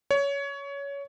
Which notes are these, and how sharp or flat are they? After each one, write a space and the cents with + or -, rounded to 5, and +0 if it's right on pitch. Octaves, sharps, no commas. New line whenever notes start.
C#5 +20